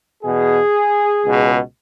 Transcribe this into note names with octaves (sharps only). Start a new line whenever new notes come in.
E2 B2 G#4
C#2 B2